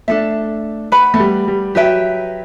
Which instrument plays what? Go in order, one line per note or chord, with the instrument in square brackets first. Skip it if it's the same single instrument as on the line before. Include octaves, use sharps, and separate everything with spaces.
[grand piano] A3 [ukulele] D4 A4 E5
[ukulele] B4 F#5 B5
[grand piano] A3
G3
G3
[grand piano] F#3 [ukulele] G4 B4 E5 G5